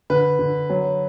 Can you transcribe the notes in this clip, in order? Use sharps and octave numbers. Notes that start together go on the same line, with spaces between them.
D3 B4
D3
F#3